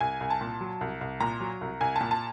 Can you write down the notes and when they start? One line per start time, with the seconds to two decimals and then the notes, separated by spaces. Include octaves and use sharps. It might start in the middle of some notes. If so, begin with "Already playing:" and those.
0.01 C2 G#5
0.21 C2
0.30 A5
0.41 A#2
0.61 F#3
0.81 C2
1.01 C2
1.20 A#2 A#5
1.40 F#3
1.61 C2
1.80 C2 G#5
1.96 A5
2.01 A#2
2.11 A5